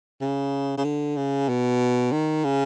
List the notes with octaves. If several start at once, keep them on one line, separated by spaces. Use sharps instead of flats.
C#3
C#3
D3
C#3
B2
D#3
C#3